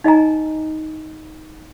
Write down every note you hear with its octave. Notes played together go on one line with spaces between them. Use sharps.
D#4 D#5 G#5 A#5